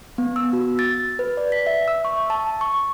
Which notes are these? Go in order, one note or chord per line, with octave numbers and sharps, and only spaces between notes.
B3
E6
F#4
A6
B4
D5
B6
E5
E6
C#6
A5
C#6